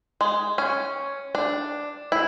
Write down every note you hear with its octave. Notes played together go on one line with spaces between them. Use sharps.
G#3
C#4
D4
E4